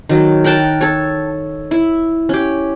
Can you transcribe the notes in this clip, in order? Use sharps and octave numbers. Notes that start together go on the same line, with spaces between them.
D#3 F#3
A#4 F#5 G5 A5
A4 C#5
E4
C#4 G4